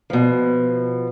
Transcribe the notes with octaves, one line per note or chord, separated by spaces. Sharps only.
B2 F3